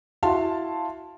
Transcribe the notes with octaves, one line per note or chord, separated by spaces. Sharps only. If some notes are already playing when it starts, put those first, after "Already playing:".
E4 F#4 F5 A5 C6